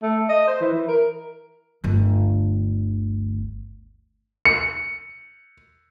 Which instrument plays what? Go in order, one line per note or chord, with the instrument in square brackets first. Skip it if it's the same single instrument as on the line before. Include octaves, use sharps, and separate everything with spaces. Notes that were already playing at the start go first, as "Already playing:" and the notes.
[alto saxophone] A3
D#5
C5
E3
E3
A#4
[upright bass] G1 D2
[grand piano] C#7